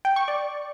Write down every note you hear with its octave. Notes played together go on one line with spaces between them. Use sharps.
G5
C#6
D5